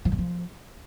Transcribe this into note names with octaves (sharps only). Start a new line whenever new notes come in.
F3
G2
F3